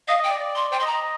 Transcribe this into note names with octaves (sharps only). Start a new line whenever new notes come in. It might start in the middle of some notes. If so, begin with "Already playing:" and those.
D#5 F5
D#5 G5
D5
D5
C6
C5 G5
D#5 C6
A#5
D#5